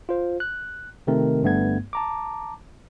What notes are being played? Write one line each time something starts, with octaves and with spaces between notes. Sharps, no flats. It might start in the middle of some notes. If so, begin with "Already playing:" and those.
F4 C5
F#6
C3 D#3 A3 C4 A#4
G1 G2 A3 B3 G#6
A5 A#5 D6